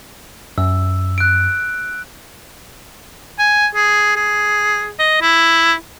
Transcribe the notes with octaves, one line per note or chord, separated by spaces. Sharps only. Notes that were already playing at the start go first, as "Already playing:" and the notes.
F#2 E6
F#6 D7
G#5
G#4
G#4
D#5
E4